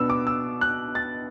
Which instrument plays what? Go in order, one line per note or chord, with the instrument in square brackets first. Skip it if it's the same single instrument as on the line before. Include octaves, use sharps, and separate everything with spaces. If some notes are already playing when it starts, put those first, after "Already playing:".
Already playing: [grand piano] B2 B3 D4 E6
D6
E6
F#6
A6